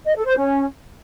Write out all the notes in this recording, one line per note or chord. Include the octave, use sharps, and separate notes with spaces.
D#5
A4
C5
C#4